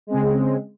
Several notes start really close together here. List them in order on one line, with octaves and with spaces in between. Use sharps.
G#3 C4 C#3